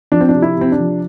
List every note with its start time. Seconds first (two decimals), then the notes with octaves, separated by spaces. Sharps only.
0.12 F3 D4
0.21 C4
0.29 D4
0.35 C3
0.42 E4
0.57 C3 C4
0.72 D4
0.79 F3